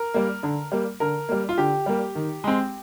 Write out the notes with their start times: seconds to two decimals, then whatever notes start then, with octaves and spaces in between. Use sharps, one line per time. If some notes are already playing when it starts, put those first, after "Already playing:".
Already playing: A#4
0.14 G3 A#3
0.43 D3
0.72 G3 A#3
1.00 D3 A#4
1.29 G3 A#3
1.49 F4
1.58 D3 G4
1.86 G3 A#3
2.15 D#3
2.44 G#3 C4